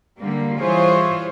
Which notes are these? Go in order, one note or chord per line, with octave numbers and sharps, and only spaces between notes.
D3 G3 A#3
E3 G3 F4 G#4 C5 C#5